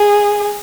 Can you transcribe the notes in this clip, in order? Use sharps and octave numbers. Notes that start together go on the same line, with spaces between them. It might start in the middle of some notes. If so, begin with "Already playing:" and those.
Already playing: G#4